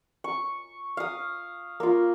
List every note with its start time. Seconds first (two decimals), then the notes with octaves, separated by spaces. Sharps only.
0.24 C#6
0.97 F5 D#6
1.80 A#3 F4